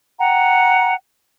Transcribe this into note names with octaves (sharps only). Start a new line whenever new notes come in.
F#5 G5 A#5